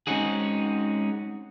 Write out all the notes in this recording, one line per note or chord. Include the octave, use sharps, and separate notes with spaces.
G#3 C4 C#4 D#4 F#4 G#4